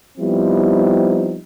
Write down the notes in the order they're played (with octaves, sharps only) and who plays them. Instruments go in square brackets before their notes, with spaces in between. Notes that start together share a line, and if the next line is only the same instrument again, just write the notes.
[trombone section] F3 G3 B3 C4 D#4 E4